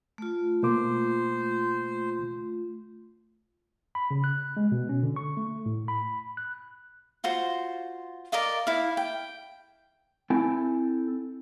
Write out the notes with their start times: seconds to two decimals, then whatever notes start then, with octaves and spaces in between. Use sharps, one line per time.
0.18 A3 F4
0.63 B2 A#3 C5 D6
3.95 B5
4.11 C#3
4.24 F#6
4.57 G#3
4.72 B2
4.89 C#4
5.03 D3
5.16 C#6
5.37 A3
5.66 A2
5.88 B5
6.37 F#6
7.24 F4 F#4 C5
8.32 A#4 D5 D#5 F5
8.67 E4 F5
8.97 G5
10.30 C4 E4 A4 G5 G#5